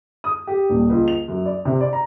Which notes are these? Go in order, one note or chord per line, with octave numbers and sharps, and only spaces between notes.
D#6
G4
D#1
C#2
F7
F#2
D5
C3
D5
A#5